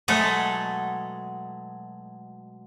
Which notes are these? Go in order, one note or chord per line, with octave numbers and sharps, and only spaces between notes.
B2 F#3 G#3 A3 A4